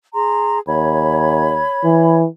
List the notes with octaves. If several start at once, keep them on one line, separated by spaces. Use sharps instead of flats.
G#4 A#5 C6
D#2 C#5 B5 G#6
E3